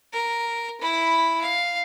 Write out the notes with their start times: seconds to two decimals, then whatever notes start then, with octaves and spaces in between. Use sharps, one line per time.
0.13 A#4
0.81 E4 B5
1.41 F5